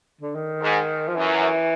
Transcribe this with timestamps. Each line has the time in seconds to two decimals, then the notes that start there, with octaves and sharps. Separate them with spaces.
0.21 D3
0.35 D#3
0.61 G#2
1.08 F3
1.15 F#2 E3